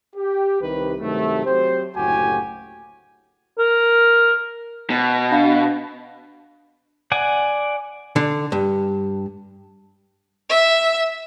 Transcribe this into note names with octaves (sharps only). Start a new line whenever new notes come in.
G4
C2 C3 D#3 B4
G2 C3 D#3 F#3 A3
F#3 C4 G4 C5
F#1 D2 A2 F#4 G4 G#5
A#4
B2
D4 F5 B5
D5 F#5 G#5
D3
G2
E5